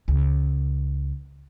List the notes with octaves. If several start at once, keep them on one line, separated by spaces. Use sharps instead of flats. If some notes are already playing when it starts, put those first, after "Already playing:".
C#2